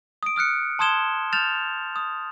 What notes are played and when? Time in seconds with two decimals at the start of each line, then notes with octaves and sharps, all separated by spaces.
0.23 D#6 D7
0.36 D#6 F6 F#6 C#7
0.79 A5 C6 D#6 G#6 E7 G7
1.33 F6 G6 A6 E7 F7
1.96 D#6